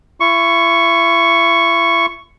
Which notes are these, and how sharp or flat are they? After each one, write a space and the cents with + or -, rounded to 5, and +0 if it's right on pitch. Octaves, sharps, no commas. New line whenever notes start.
E4 +40 C#6 +0